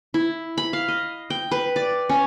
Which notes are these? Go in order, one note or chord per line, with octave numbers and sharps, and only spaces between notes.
E4
B5
F5
D#5
G5
B4
D5
C#4